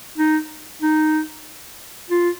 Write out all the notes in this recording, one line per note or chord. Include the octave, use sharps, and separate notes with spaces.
D#4
D#4
F4